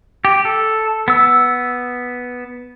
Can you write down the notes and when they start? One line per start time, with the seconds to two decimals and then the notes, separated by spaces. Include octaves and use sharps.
0.25 G4
0.45 A4
1.08 B3 E6